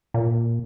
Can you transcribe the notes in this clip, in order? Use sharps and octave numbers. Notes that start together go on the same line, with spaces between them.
A#2